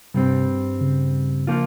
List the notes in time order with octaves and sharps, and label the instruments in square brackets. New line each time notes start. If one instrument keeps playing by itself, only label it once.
[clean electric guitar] G2 G3 C4 [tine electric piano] C3
[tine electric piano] C#3
[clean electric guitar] F3 A#3 F4